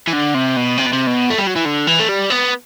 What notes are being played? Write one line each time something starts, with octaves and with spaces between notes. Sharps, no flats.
E3
D3
C3
B2
C3
B2
C3
B2
A3
G3
F#3
E3
D3
E3
A3
G3
B3